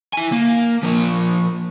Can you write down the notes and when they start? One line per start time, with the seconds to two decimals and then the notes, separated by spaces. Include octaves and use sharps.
0.13 E4 G#5
0.32 A#3
0.83 F3 A#3